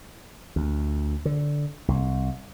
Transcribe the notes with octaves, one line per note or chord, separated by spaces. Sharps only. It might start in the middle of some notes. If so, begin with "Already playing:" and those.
D2
D3
C2